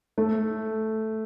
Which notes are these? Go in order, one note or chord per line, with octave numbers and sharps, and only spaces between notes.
A3